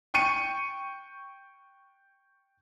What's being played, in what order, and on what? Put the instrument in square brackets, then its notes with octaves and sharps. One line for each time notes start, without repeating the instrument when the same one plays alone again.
[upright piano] G5 C#6 C#7 D#7